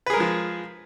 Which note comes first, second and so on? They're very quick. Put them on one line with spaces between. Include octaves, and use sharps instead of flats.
B4 G#4 A#4 G#3 F3